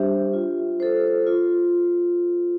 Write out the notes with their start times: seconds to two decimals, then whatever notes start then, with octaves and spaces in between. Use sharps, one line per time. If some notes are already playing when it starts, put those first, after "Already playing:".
Already playing: G3 D4 G4 C5 E5
0.33 F4
0.80 A4 C5
1.26 F4